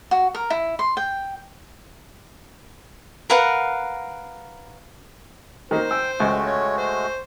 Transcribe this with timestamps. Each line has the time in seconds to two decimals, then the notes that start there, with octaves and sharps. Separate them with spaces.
0.11 F#4
0.35 A#4
0.50 E4
0.79 C6
0.97 G5
3.30 A#4 B4 F5 F#5
5.71 D#3 A#3 C5
5.91 G5 E6
6.20 C#2 G#3 A3 F#4
6.46 C#5
6.78 C5